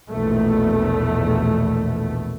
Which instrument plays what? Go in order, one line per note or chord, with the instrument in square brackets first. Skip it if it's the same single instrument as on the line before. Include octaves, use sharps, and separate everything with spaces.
[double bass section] A#1 E2 B2 A3